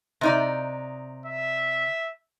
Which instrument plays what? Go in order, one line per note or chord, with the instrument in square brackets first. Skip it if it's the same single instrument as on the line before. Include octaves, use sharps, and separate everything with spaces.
[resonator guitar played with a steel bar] C3 D#4 D5
[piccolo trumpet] E5